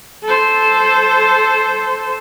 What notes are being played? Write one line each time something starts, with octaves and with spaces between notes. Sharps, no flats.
A4 C5